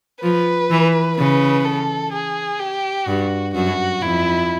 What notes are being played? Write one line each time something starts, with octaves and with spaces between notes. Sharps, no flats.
F3 B4
E3
C#3 B4
A4
G#4
G4
G2 F#4
F#2 F#4
F2 E4